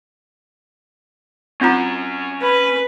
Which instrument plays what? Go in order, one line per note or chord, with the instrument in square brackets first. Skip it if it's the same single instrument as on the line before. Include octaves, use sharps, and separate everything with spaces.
[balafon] C4 F4 A#5 [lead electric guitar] C#4 F#5
[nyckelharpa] B4